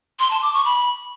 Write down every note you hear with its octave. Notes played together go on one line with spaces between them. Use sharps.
C6
A5
D6
C#6
B5